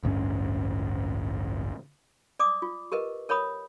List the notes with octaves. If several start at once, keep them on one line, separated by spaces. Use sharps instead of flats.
A1 D2 G2 C#4
D5 D6 D#6
F4
G4 A#4 B4 D#5
A#4 C#5 F#5 B5 D#6